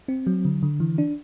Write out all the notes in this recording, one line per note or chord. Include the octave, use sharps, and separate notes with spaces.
C4
F#3
D3
D3
E3
D4